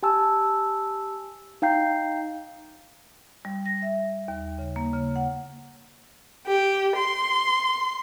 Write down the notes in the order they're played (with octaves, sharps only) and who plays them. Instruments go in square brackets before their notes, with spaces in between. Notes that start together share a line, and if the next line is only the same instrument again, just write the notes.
[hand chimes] G4 G#5 A5 E6
D#4 F5 G5 A#5 G6 C7
[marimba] G3
A#6
E5
D#2
C#3
A#3
C#3
F#5
[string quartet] G4
C6